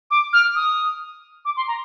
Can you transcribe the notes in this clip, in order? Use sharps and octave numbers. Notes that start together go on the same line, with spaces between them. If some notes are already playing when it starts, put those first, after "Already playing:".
D6
F6
D#6
D6
C6
A#5